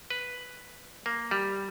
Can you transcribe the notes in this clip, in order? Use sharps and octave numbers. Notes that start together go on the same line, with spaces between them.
B4
A#3
G3